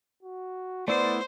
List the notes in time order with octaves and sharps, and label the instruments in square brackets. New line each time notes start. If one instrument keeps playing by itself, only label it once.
[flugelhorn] F#4
[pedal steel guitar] A3 E4 C6 [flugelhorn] B3 [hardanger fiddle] C5 [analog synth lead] D5